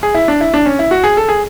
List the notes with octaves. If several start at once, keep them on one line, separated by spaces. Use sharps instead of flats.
G#4
E4
D4
E4
D4
C#4
E4
F#4
G#4
A4
G#4